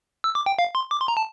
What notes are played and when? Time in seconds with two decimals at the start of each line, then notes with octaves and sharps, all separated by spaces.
0.24 E6
0.35 D6
0.46 G5
0.59 F5
0.75 C6
0.91 D6
1.00 C6
1.08 A#5
1.17 A5